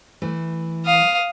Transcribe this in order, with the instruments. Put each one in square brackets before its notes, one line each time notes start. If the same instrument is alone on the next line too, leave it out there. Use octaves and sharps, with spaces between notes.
[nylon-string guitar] E3 A3
[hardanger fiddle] F5 D#6